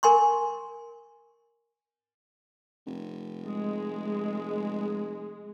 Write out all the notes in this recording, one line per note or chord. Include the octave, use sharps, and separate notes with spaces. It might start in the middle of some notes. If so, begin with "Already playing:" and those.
A#4 G#5 C6 C#6
F1
G#3